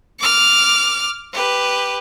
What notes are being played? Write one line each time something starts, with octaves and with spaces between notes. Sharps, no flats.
D6 F6
G4 B4